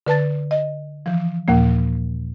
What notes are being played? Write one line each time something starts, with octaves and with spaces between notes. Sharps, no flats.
D3 B4 A5 A6
D#5
E3 F3
D#2 A#2 F3 A#3